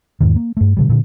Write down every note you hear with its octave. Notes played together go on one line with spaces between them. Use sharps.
E2 G#2 D#3
A#3
G2 A3
B2 D3 G3
A#2 D3